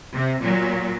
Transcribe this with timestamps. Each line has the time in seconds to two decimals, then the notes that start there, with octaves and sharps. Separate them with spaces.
0.13 C3
0.42 A#2 F#3